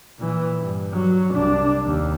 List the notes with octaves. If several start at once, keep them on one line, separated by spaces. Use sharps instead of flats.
A#2 E3
G2
F#3
C2 D4
D#2